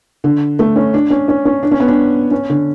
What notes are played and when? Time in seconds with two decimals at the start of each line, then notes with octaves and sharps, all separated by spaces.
0.24 D3
0.59 A3
0.76 C#4
0.94 D4
1.10 C#4
1.28 C#4
1.45 C#4
1.63 D4
1.71 C#4
1.80 B3
1.88 D4
2.31 C#4
2.50 D3